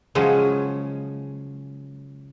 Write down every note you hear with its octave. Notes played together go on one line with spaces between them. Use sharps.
C#3 F3 F#3 G#3 C#4